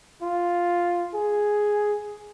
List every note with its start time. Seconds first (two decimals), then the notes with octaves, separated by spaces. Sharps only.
0.22 F4
1.14 G#4